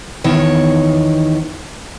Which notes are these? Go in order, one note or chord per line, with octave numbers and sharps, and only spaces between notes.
E2 D#3 C#5